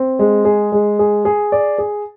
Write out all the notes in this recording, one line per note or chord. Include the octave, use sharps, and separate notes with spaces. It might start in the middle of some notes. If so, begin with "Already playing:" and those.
Already playing: C4
G#3
G#4
G#3
G#4
G#4
D5
G#4